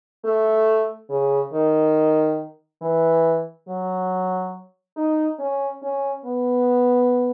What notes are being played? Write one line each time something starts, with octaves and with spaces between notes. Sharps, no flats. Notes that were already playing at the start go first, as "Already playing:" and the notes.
A3
C#3
D#3
E3
F#3
D#4
C#4
C#4
B3